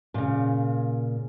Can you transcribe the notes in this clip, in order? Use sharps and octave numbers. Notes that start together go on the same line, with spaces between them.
A#2 C#3